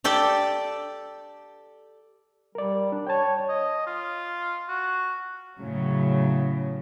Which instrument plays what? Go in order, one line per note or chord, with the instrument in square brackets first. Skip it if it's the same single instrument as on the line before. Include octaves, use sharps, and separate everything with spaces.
[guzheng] G4 A4 D5 G5
[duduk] G3 [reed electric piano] A#4 D5
[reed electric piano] D4
[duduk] C#5 [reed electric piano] G5 A5
[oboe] D#5
F4
F#4
[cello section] A2 C#3 F#3